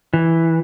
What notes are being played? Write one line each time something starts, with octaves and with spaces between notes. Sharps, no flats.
E3